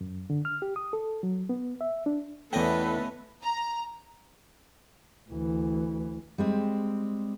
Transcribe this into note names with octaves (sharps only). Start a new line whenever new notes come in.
F#2
D3
F6
G4
D#6
A4
F#3
B3
E5
D4
E2 A3 B3 C#4 A4 B4 D#5 G5
A#5
D2 E3
G3 G#3 C4